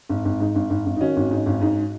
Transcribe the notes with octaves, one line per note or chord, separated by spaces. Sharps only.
G#1
G#1
G#2
G#1
G#1
G#1
D#4
D#3 C#4 F#4
G#1
G#2
G#1
G#2